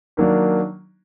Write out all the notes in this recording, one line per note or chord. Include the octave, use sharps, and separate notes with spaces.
D#3 F#3 A#3 D4